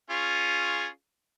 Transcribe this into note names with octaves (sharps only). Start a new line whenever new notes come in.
C#4 F4 G#4